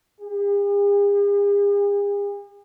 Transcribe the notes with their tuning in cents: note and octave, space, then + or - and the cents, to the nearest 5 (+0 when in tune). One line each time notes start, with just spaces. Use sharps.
G#4 -45